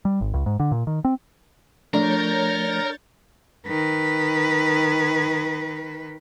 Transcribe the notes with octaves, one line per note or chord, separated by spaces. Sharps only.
G3
G#1
C#2
G#2
D3
A#2
D#3
C4
F3 A3 D4 A#4 C#5 G6 A6
D#3 B4